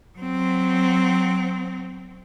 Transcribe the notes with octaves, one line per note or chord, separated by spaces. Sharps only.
F#3 C4